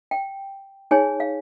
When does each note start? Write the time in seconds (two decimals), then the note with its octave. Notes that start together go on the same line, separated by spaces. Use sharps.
0.11 G5
0.91 D#4 G#4 C#5 G#5
1.20 F5